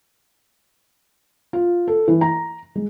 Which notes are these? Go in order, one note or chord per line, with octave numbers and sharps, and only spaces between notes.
F4
A4
E3
A#5
G#3